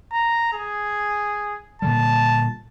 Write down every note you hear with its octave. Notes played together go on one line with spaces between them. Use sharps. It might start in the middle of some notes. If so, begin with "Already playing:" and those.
A#5
G#4
A#2 D3 G3 A5